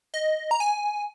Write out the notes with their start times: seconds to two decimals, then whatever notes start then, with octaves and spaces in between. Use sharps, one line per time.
0.14 D#5
0.51 A#5
0.60 G#5